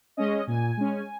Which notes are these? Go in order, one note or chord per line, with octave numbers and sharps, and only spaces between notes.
G#3 C#4 D#5
A#2 G#5
G#3 C#4